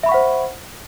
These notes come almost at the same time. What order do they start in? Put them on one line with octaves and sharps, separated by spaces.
E5 B5 C#6 F#5 C5